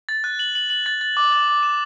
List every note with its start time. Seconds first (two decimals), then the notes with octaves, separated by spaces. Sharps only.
0.09 A6
0.24 F#6
0.39 F#7
0.55 F#7
0.70 F#7
0.86 A6
1.01 A6
1.17 D6
1.32 A6
1.48 D6
1.63 E7